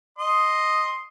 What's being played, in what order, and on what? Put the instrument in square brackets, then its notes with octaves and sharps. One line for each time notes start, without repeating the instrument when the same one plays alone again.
[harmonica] D#5 C6